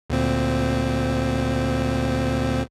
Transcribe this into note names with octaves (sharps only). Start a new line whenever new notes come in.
D2 A#2 C4